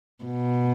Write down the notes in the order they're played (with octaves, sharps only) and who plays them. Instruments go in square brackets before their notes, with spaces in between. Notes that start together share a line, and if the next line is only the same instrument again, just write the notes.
[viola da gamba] B2